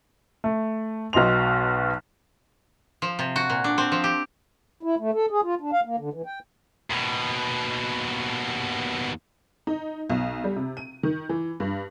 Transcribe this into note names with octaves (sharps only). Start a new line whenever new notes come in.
A3
B1 B2 D#5 C6 F7
F3
C3
F#4
A#2
D4
C4
F3
G4
E4
A3
A4
G#4
F4
D4
F5
A#3
D3
E3
G5
D#2 B2
D#4
B1
G3
C3
D#7
D#3
E3
G2